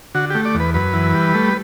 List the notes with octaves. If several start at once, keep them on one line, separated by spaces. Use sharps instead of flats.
D3 F#4
A3 G4
D5
E2
B4
F#2 B4
E3
G3
A3